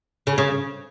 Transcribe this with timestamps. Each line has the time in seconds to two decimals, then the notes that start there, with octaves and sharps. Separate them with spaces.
0.27 C#3
0.38 C#3